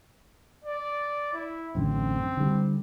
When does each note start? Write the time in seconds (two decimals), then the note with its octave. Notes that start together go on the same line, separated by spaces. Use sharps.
0.64 D5
1.34 E4
1.75 A1 F#2 D3 C4
2.37 D3 G3